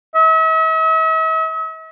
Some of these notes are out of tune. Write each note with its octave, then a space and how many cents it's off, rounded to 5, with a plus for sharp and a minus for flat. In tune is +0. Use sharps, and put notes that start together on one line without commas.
E5 -45